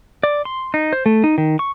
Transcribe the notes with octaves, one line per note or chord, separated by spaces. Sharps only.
D5
C6
D#4
C5
A3
D#4
D#3
C#6